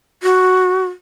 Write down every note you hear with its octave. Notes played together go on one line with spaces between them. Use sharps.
F#4